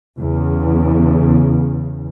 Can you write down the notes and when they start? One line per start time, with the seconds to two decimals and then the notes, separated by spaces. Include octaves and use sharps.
0.20 E2 C#3